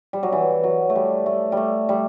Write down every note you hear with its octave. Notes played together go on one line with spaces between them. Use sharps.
G3
F#3
E3
F#3
A3
G3
A3
G3 A3
G3